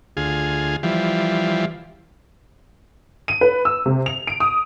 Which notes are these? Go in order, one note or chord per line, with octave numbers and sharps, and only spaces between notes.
D2 F4 G#4
E3 F3 G3
D#7
B4
E6
C3
F7
D7
D#6